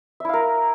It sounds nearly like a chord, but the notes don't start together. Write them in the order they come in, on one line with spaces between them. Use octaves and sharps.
E5 E4 F5 A#4